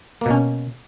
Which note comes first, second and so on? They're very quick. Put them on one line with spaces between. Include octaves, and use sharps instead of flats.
A#3 B2 C#4